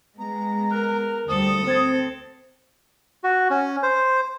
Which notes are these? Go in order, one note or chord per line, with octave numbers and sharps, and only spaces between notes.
G#3 B3 A#5
A#4 F6 F#6
D2 G3 A4 C5 D#6
C4 C5 G#6 A6
F#4
C#4
C5